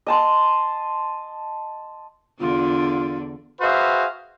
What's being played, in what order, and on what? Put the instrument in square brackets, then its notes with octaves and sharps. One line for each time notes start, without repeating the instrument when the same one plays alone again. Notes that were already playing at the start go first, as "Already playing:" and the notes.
[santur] D#5 A5 C6
[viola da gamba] E2 D3 D4 [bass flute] F4
[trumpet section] F#4 G#4 B4 C5 E5 F5